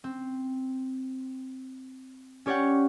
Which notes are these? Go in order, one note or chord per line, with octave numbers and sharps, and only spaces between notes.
C4
C#4 G4 C#5 D5 F#5 G5